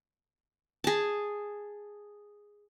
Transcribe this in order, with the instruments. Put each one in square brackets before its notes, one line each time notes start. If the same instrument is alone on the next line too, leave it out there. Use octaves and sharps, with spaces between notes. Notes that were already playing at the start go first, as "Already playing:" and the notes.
[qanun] G#4 A5